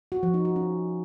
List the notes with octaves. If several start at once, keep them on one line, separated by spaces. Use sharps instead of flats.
F#4
F3
D#4
F#4
C#4